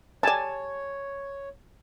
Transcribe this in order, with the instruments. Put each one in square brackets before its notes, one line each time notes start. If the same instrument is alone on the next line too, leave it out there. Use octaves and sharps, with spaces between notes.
[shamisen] G3 D5 [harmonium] C#5 [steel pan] G#5 A5